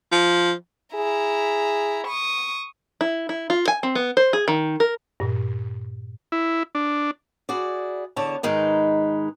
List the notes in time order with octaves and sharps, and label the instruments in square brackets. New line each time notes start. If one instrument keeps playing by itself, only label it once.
[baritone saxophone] F3
[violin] E4 A#5 [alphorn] G#4
[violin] C#6 D#6
[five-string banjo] E4
E4
F4
G#5
C4
B3
C5
G#4
D#3
A#4
[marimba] G2 A#2
[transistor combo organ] E4
D4
[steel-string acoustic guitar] E4 F#4 G#4 D5
E2 D3 C#5 A5
G#2 D#3 G#3 D#4 B4